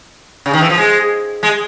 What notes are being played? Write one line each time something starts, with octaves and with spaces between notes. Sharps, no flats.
C#3
D#3
E3
F3
G#3
G#3